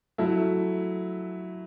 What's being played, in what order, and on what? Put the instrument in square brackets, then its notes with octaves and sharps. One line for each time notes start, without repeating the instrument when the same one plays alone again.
[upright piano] F#3 A3 E4